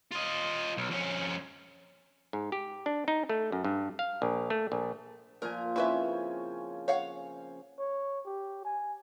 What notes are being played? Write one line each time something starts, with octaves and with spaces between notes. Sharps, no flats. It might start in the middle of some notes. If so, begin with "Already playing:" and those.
F4 D#5
B1
F2 C#4
G#2
G4
D4
D#4
A3
F#2
G2
F5
A#1
A3
A#1
A#2 F3 A#4 G#5
C#3 C4 C#4 E4 B4 E5
C#5 F5 F#5
C#5
G4
G#5